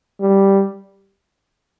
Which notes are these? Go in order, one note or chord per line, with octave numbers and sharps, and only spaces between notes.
G3